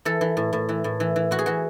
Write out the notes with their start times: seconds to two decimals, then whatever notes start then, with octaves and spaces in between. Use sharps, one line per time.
0.05 E3 A4
0.21 E3
0.37 A2
0.53 A2
0.69 E3
0.84 A2
1.00 E3
1.16 E3
1.31 E3 F#4
1.39 G#4
1.46 E3 F#4